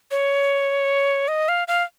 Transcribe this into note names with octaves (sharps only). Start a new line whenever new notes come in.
C#5
D#5
F5
F5